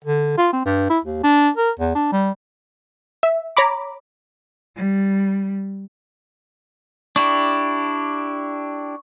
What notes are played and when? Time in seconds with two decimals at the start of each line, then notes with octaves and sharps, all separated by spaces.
0.05 D3
0.38 F4
0.53 C4
0.65 G2
0.90 E4
1.05 D#2
1.24 D4
1.57 A#4
1.80 E2
1.95 D4
2.12 G3
3.23 E5
3.57 C#5 A#5 B5 D6
4.75 G3
7.16 D4 E4 G4 C#6